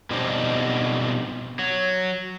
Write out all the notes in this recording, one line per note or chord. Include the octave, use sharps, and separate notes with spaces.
B2 F3 G3 C4 D4 D#4
F#3